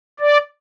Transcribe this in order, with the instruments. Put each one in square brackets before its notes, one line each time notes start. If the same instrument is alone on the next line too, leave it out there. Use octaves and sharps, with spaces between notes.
[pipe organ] D5